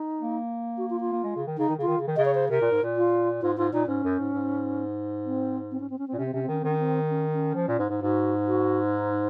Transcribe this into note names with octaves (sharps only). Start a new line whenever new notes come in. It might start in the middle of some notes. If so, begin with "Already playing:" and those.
Already playing: D#4
A#3
F#4
F4
F4
A#3
G#3
C#3
D#3
C#3 D#4
D#3
C#3 F4
D#3
C#3
D#3
C#3 D#5
C#5
C5
C3 A#4
A#2
G#2
A#2
F4
G#2 F4
G#2 F4
A#2 D#4
G#2 C#4
F#2
G#2
G#2
C4
C4
C#4
C4
C#4
C4
A#2
C3 C#4
C4
C3 C#4
C4
D#3 C#4
D#3 C4
C#4
C4
C#4
C#4
F3
A#2
G#2
G#2
G#2 F#4
F#4
D#4